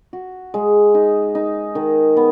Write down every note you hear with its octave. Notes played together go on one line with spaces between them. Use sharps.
F#4
G#3
D#4
D#4
D#3
B3